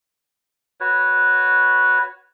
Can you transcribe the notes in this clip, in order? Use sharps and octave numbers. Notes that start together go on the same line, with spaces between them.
F#4 B4 C#5